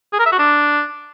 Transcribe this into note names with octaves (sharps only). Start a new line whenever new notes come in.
G#4
A#4
E5
F#4
D4